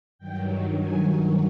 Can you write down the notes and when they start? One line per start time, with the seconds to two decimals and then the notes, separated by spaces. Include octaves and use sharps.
0.18 G2 D#3 F#3 G5
0.79 G#5